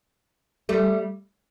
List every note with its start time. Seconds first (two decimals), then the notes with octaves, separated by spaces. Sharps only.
0.69 G3 A3